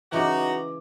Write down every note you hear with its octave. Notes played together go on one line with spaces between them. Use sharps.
C#3 E3 D#4 E4 F#4 D#5 D6